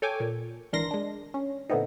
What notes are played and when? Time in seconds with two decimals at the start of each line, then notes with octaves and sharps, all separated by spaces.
0.02 A4 C#5 G5 G#5 D6
0.20 A#2
0.73 G#1 E3 D4 A#4 C6 A#6
0.91 G#3 D4
1.34 C#4
1.69 A#2 D3 A3 B3 C4 D#4